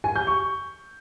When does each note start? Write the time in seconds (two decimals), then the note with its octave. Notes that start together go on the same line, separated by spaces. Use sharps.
0.04 G#5
0.16 G6
0.27 C#6